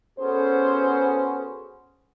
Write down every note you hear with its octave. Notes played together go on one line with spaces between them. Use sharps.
B3 C#4 F#4 G#4 A4 C5